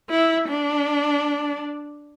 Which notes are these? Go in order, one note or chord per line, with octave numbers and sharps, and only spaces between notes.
E4
D4